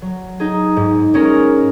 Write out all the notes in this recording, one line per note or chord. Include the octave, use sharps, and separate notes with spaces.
F#3
D#4 G#4
G#2
G#3 C#4 A#4